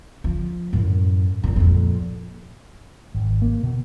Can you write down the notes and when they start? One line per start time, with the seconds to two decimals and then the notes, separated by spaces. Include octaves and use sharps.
0.24 F3
0.73 F#2 A2
1.44 F#2 A#2
1.56 F2 A#2
3.15 G#1
3.42 A#3
3.63 B2